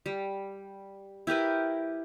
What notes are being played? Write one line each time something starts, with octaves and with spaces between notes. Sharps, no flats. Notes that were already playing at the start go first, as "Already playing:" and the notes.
G3
E4 G4 A#4 B4